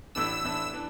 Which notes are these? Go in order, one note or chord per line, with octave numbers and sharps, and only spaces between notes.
A1 A2 E3 D4 E6
A1 A2 E3 D4
E3 D4